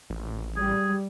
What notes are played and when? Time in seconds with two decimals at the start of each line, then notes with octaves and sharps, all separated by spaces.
0.10 A1
0.57 G3 G#4